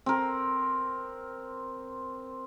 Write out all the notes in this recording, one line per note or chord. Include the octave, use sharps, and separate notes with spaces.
C4 A#4